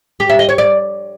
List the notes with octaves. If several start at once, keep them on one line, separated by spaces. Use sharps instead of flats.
G4
E5
D#5
C#5
D5